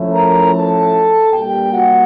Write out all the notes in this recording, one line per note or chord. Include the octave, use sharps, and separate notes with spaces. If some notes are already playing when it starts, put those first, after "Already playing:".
Already playing: F3 A3 C#4 E4
A#4 A#5
A4 A5
A#2 G3 A#3 D4 G4 G5
F#4 F#5